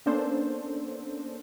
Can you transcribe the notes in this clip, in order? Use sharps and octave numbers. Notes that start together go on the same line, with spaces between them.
A#3 B3 C#4 D4 A4 C5